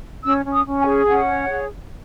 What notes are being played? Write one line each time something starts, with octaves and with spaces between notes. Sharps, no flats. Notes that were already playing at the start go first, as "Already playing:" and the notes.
C#4 E6
C#4
D#6
C#4
G#5
G#4
C#4 F#5
C#5
G#4